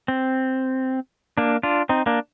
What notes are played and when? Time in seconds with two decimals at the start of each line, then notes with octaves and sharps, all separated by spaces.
0.08 C4
1.38 A#3 D4
1.63 D4 F4
1.89 C4 D#4
2.06 A#3 D4